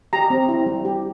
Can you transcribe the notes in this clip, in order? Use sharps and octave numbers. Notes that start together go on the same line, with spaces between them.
G4 A#5
C4
E4
G3
G4